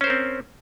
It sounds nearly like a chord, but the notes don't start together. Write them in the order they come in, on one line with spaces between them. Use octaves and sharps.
C#4 C5 A#4 C4